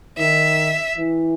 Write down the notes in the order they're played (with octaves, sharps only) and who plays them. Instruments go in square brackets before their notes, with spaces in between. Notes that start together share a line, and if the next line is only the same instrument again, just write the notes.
[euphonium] D#3 [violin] E5
[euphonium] E3